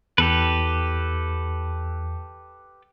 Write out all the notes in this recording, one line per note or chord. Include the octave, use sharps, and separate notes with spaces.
E2 G4 A4 B4